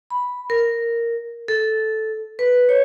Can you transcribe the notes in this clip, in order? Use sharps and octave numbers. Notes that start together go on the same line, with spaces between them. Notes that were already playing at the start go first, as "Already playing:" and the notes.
B5
A#4
A4
B4
C#5